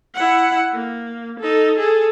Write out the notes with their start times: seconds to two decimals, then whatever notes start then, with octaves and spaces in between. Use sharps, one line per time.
0.15 E4 F#5
0.73 A#3
1.40 D#4 A4
1.79 G#4 A4